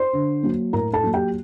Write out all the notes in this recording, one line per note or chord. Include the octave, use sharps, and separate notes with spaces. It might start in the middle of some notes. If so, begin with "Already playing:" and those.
Already playing: C5 C6
D3
F#3 A#3
A2 A#4 A#5
A4 A5
F#3 A#3
G4 G5